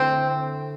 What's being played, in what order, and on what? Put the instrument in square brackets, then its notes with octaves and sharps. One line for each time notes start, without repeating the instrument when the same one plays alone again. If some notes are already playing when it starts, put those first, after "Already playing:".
Already playing: [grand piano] D3 A3 E4 [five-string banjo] C4